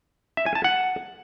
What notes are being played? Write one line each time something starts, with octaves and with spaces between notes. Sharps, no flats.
E5
G#5
A5
F#5